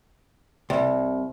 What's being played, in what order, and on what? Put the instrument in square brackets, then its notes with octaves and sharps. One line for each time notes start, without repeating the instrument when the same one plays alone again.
[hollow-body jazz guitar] C2